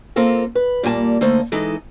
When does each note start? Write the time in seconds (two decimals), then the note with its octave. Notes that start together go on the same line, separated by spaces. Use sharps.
0.16 A#3 C4 F4 A4 A#4
0.55 B4
0.83 A#2 G3 A#3 G#5 A5
1.21 D3 A3 A#3 D#4 C5
1.52 E3 G#3 D#4 A4